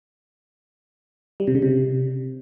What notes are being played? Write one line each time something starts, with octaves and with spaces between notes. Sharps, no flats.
G3
C3
C#3
C3